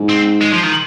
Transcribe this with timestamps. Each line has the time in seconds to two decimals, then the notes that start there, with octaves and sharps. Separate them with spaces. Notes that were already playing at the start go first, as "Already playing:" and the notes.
Already playing: G#2
0.09 C4
0.41 G#3
0.53 F3
0.64 D#3